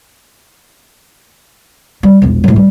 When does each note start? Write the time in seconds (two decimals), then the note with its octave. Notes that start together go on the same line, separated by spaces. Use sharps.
2.03 G3
2.22 E1 A#1
2.44 A2 F#3
2.56 G3